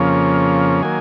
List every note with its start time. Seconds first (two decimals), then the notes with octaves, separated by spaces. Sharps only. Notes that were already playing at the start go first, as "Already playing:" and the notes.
Already playing: F2 C#3 F3 A#3 C#4
0.83 D#3 F#3 A#3 G#5